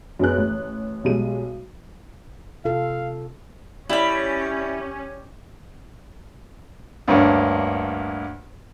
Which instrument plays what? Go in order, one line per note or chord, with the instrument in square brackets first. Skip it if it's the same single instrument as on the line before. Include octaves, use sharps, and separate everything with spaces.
[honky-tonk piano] F#2 B3 C#4 G#4 F#6
A1
B1 G3 G#3 D#7
[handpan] C3 F4 A4 [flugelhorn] F5
[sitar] G3 [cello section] C#4 [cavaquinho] E4 B5
[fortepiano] D2 G2 A#3 C#4 D4